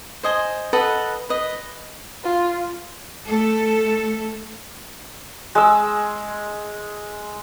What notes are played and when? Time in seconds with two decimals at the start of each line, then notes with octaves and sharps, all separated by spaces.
0.23 C5 D#5 G#5
0.73 A4 B4 D#5 F#5
1.29 B4 D#5
2.24 F4
3.28 A3 A4
5.55 G#3 E6